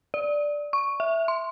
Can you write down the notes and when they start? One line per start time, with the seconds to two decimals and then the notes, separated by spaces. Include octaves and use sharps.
0.14 D5
0.73 C#6
1.00 E5
1.28 C6